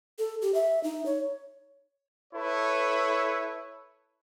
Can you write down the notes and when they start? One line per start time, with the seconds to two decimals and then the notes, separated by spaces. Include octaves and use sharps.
0.18 A4
0.42 G4
0.54 E5
0.84 D#4
1.06 C#5
2.33 E4 A4 B4 C#5